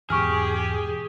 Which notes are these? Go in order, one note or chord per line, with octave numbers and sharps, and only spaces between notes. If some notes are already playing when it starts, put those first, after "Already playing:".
E2 G#2 B2 G4 G#4 C#6 F6